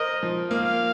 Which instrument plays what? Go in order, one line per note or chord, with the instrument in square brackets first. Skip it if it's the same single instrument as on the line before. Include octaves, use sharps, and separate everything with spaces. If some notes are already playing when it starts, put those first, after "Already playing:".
Already playing: [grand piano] A#4 C5 [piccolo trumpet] D#5
[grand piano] F3
[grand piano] A#3 [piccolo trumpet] F5